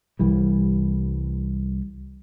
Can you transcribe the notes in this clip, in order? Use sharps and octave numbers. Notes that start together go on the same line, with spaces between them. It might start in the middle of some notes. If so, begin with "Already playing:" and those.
C2 E3 G3